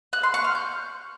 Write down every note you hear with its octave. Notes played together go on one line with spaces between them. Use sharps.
F#6
C6
C#6
F6
G6